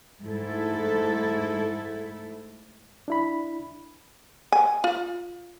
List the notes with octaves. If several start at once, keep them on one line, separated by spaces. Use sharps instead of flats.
G#2 A3 E4 A4
D4 E4 B5
G#5
F4